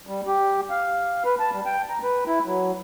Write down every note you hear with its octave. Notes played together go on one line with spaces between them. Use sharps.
G3
G4
F5
B4
A5
G3
G5
A#5
B4
E4
F#3